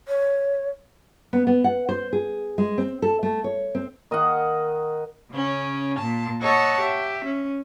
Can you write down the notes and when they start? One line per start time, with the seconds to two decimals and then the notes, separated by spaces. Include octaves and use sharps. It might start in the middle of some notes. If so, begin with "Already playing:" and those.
0.08 C#5
1.33 B3
1.47 B3
1.64 F#5
1.89 C5
2.13 G#4
2.58 G#3
2.78 C4
3.02 A4
3.23 A3
3.44 C#5
3.75 C4
4.11 D#3 D#5 F5 F#5
5.31 C#3 C#4
5.99 A#2 A5
6.41 A4 C#5 D#5 F#5 A5 C#6
6.79 G4 E5
7.25 C#4